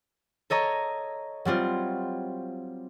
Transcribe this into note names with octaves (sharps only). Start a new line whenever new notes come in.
A4 C#5 D#5 A#5
F#3 G3 C4 F4